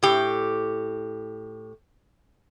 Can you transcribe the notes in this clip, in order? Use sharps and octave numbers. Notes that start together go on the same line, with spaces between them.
A2 G4